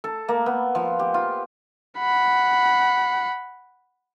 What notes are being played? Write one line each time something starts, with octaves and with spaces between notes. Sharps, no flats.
A4
A#3
B3
F3
G4
F4
F#5 B5